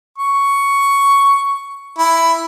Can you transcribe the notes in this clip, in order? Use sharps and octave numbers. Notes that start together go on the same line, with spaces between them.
C#6
E4